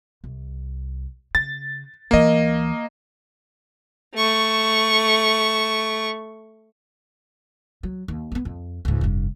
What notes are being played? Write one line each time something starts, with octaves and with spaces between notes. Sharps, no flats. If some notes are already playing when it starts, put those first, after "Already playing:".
C2
C#3 A6
D2 E3 A#3 D#5
A3 C#6
F#3
D#2
A#3 B3
F2
C#2 G#2
F1 G2